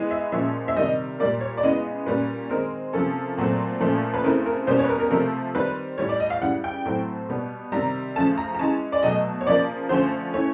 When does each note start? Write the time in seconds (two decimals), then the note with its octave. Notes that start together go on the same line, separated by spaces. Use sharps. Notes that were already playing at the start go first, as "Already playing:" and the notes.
Already playing: E3 G#3 B3
0.11 E5
0.32 A#2 F3 G#3 C#4 E5
0.68 E5
0.76 C3 D#3 G3 D#5
1.19 A#2 G3 A#3 D5
1.41 C#5
1.57 D5
1.63 C#3 E3 G#3 B3 D#5
2.06 A#2 G3 A#3 C#4 B4
2.49 D#3 G#3 C4 A#4
2.93 C3 F3 A#3 C#4 A4
3.38 A#2 F#3 A3 C4
3.81 A#2 F3 A3 C#4
4.14 B4
4.24 C#3 E3 A3 C4 A#4
4.46 A#4
4.67 B2 G3 A#3 C#4 C5
4.79 C#5
4.84 B4
4.89 A#4
5.00 A#4
5.11 C3 F3 A3 A#4
5.55 D#3 G3 C4 B4
5.98 A2 E3 G3 C#5
6.09 D5
6.20 D#5
6.30 F5
6.42 C#3 E3 G3 F#5
6.64 G5
6.85 A2 F#3 A3 C4
7.29 B2 G3 B3
7.72 C3 D#3 G3 A#5
8.16 C#3 F3 A3 C#4 A5
8.38 A#5
8.55 A#5
8.59 E3 G#3 C#4 A5
8.92 D5
9.03 B2 F#3 A3 D#5
9.41 C#5
9.47 C#3 F3 A#3 D5
9.89 D3 F3 A3 C#4 C5
10.33 E3 A3 C#4 C#5